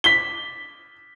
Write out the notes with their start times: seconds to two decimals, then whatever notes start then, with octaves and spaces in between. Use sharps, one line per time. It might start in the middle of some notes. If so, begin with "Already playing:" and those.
0.04 B6 G7